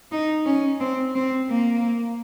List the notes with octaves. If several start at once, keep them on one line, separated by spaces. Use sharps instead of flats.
D#4
C#4
C4
C4
A#3